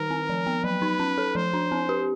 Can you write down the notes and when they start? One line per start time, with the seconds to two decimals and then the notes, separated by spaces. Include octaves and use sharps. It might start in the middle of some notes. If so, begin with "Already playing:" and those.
Already playing: D#3 D#4 A#4
0.10 C4
0.29 F3
0.47 B3
0.64 F#3 B4
0.82 D#4
0.99 C#4
1.18 A4
1.35 F3 C5
1.54 D4
1.72 C4
1.89 G4